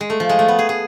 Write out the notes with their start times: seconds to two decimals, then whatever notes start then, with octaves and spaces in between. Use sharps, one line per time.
0.01 G#3
0.10 A3
0.20 F3
0.29 G#3
0.39 A3
0.48 B3
0.59 G#4
0.69 G#4